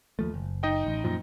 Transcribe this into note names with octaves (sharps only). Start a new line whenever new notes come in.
D#2 F3 A3
F#1
D#4 D#5 G5
A1
F#2 A#2 F3